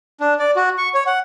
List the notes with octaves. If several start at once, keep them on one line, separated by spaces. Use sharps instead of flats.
D4
D5
F#4
C#6
C#5
F#5